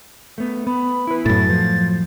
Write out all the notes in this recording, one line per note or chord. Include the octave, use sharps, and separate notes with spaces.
A3 B3
B3 B5
E4 B4
F#2 A2 A6
F3